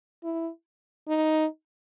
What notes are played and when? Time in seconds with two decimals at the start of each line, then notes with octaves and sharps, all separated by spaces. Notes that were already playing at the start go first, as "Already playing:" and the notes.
0.24 E4
1.08 D#4